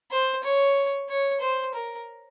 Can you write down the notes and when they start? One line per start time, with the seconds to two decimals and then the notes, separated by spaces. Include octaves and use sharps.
0.11 C5
0.43 C#5
1.09 C#5
1.41 C5
1.74 A#4